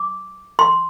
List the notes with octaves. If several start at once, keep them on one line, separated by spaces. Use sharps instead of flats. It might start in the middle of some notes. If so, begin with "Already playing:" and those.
Already playing: D6
C6